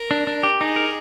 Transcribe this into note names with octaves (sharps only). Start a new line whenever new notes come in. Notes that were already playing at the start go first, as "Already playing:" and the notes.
Already playing: A#4
D4
D4
G4
D#4 G#4
A#4